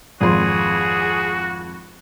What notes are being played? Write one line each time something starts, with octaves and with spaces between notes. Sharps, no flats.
G#1 F2 F#4 G#4 C6